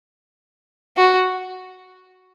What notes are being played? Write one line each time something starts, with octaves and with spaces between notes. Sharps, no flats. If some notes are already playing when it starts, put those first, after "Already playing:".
F#4